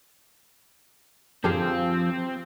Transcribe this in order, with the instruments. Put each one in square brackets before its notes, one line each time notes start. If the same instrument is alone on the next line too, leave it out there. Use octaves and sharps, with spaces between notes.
[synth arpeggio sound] F#2 D3 A5 [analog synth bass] F3 [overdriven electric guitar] C4 [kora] G4 G#4 F5